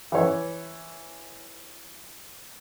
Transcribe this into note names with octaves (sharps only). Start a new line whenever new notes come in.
E3 C#5